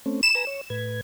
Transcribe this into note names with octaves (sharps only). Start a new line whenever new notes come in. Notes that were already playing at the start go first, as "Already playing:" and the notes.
A3 C4 C#4
B5 E7
B4 G#5 A#5
C#5
A2 B4 G#6